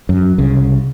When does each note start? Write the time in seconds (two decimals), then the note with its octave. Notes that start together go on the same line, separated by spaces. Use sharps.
0.09 F#2
0.38 C2 C#3